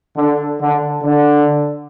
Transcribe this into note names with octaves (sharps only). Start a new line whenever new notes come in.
D3
D3
D3